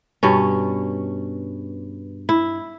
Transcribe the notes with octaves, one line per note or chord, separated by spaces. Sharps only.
G2 B2 C#4
E4